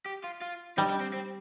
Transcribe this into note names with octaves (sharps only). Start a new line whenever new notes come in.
G4
F4
F4
G3 D#4
D4
C4
C4